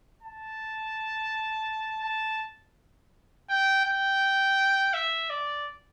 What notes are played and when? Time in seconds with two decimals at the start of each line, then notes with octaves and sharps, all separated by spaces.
0.23 A5
2.04 A5
3.49 G5
3.85 G5
4.94 E5
5.30 D5